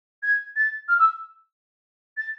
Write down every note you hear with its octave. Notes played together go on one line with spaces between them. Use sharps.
G#6
A6
F6
E6
A6